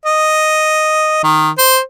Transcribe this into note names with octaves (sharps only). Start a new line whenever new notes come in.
D#5
D#3
C5